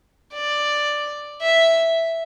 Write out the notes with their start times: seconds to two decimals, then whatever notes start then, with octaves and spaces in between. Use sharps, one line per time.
0.33 D5
1.41 E5